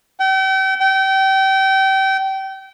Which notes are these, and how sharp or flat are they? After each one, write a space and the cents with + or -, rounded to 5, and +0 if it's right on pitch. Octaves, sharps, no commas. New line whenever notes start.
G5 -40
G5 -30